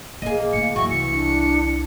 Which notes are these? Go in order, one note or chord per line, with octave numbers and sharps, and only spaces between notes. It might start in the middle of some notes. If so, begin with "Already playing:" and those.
A1 A#3 G#4 D#5
D2 A2 C#7
F#2 E3 F#4 C#6
C2 C#7
D4